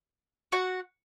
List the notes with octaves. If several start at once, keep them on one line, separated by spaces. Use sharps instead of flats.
F#4 F#5